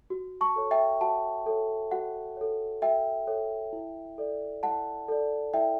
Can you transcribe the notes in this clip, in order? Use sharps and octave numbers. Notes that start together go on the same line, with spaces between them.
F#4
A5 C#6
A4 C#5
E5 G5
F#4 F#5 A5
A4 C#5
F#4 F#5
A4 C#5
F#4 E5 G5
A4 C#5
E4
A4 D5
E4 F#5 A5
A4 D5
E4 E5 G5